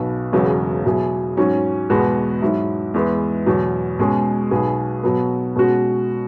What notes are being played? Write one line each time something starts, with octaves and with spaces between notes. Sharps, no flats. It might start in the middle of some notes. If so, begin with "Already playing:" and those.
Already playing: B1 B2 B3
E1 E2 C#3 F#3 B3
B2 F#3 E4 G#4
G#2 F#3 C#4
E2 B2 G#3 B3 F#4
G#2 F#3 E4
E2 E3 G#3 B3
E2 B2 F#3
B2 G#3 C#4 G#4
B1 B2 B3 G#4
B2 F#3 B3
B2 G#3 C#4 F#4